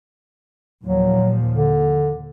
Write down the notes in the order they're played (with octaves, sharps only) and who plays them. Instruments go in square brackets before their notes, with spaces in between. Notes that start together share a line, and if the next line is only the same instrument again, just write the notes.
[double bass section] D#2 A#2 F3 [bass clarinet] F#3
[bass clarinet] D3